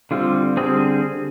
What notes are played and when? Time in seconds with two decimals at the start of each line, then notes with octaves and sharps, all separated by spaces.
0.11 D3 G3 C4 F4
0.57 D3 G3 C4 G#4